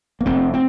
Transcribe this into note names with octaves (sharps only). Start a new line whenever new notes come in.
A#3
F1 A3 C4
C4